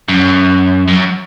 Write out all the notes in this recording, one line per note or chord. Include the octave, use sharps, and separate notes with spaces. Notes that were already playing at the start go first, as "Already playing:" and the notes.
F#2
F#2